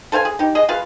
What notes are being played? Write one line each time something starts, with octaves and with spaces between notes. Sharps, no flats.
A4 C5 F5 G#5
G#4
D#4 G4
G#4 D#5
F4 G#4 B4 F5